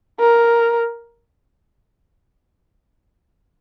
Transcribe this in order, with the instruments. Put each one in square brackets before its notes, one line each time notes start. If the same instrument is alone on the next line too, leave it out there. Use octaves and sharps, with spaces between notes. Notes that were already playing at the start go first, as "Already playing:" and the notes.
[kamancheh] A#4